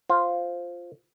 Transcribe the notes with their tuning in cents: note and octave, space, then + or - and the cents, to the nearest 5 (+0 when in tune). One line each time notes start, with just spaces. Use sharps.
F4 +0 C5 +0